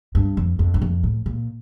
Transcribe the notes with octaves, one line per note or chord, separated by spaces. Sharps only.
G2
F2
F2
G2
F2
A2
A#2